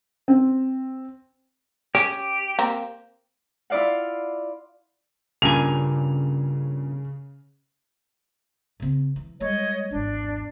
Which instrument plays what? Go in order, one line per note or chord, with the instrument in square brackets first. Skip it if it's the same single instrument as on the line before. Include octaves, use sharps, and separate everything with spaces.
[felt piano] C4
[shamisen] C#4 [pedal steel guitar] G4
[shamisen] A#3 C4
[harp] E4 F4 D5 F5 F#5
[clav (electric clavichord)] G2 A#2 G#5 [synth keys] C#3 [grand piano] F7
[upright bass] C#3 C4
E3
[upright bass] G3 G#3 [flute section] C#5 D#5
[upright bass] G#1 E2 [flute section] D4